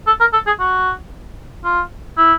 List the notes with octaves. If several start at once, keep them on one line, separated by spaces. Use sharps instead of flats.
A4
A#4
A4
G#4
F#4
F4
E4